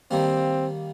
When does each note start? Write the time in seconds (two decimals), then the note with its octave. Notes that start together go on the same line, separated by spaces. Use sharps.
0.11 D#3 G3 A#3 C4